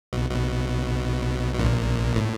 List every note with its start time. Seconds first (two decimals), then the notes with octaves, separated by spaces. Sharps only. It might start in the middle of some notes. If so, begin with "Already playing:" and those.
0.13 B1 B2
0.30 B1 B2
1.55 B2
1.59 A#1 A#2
2.16 A2